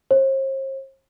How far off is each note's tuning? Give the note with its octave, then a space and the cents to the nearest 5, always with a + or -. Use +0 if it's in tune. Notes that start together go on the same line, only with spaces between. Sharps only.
C5 +45